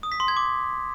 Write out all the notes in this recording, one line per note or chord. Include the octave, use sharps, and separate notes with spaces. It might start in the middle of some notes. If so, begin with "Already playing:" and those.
D#6
B6
C6
G#6
D6